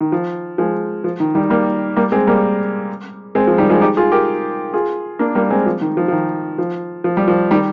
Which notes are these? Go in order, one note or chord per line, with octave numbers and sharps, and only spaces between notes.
D#3
F3
F3 G#3
F3
D#3
D#3 G3
G3 A#3
G3 A#3
G#3 C4
G3 A#3
G#3 C4
F3
D#3 G3
F3 G#3
D#4 G4
F4 G#4
G4 A#4
F4 G#4
A#3 D4
G3 A#3
G#3 C4
F3
D#3
F3
F3
D#3
F3
F3
G3
F3
D#3 G3